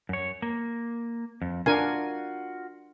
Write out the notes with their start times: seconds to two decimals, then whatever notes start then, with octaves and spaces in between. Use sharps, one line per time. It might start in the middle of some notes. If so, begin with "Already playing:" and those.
0.09 F#2 C#5
0.42 A#3
1.42 F2
1.66 D4 F4 F#4 A#4 G#5